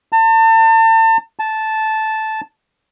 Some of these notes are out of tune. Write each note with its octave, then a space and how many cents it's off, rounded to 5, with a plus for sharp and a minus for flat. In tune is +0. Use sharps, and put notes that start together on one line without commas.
A5 +35
A5 -10